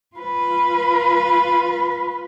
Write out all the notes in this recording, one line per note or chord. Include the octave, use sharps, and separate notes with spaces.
F4 B4